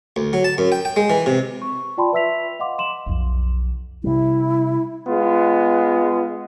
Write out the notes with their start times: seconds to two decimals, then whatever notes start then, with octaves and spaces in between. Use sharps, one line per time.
0.16 D2
0.33 F#3
0.44 A5
0.58 F#2
0.72 G5
0.85 G5
0.96 G#3
1.10 E3
1.26 C3
1.62 C#6
1.98 F4 D5 G5 A5 B5 C6
2.12 B4 E5 E6 B6 F7
2.59 D#5 F5 F#5 C6 D6
2.79 C6 E7 F#7
3.06 B1 F2
4.04 C3 G3 E4
5.07 G#3 B3 F4